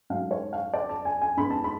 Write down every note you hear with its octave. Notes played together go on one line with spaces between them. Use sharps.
G#2 F#3 A3 F5
C#5
F5
D5
A5
G#5
G#5
G#2 G#3 B3 B5
A5
B5